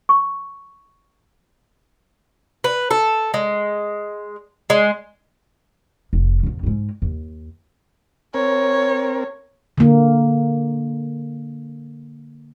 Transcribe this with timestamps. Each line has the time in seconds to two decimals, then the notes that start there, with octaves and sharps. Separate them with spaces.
0.09 C#6
2.64 B4
2.91 A4
3.34 G#3
4.70 G#3
6.13 F1
6.43 A1 E2
6.63 G#2 G#3
7.02 D#2
8.34 C4 A#4 C#5
9.78 D3 A#3